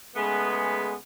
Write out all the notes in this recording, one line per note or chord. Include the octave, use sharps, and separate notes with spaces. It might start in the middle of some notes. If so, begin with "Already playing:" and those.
C#3 G#3 A3 B3